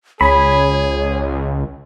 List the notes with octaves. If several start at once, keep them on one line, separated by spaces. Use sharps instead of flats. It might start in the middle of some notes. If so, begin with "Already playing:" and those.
C#2 G#4 C#5 B5